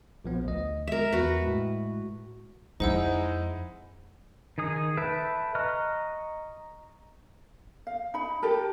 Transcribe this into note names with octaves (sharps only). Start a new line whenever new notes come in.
A#1 F3 B3
D2 D#5
G#3 A#4 E5
E2 F#4 B4
A2 G#3
F2 G#3 D#4 E4 C5 F#5 E6
D#3 D#4 G#4 D#6
A4 B4 E5 G5
D#5 A#5 C#6 F6 F#6
F5
D#4 B5
G4 A4 A#4